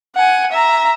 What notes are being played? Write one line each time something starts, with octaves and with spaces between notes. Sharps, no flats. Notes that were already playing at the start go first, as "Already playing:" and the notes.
F#5 G#5
E5 A#5